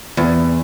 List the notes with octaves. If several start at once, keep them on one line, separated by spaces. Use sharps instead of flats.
E2